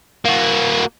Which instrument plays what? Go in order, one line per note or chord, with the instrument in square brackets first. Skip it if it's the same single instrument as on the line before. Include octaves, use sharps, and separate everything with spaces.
[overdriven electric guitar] A#3 F#4